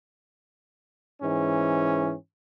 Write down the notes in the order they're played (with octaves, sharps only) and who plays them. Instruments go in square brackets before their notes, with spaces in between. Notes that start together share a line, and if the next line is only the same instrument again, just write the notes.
[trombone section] G#2 E3 C#4